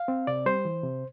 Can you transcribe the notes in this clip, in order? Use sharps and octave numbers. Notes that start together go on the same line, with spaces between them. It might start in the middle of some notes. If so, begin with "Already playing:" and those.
Already playing: F5
C4
C3 D5
G3 C5
E3
C3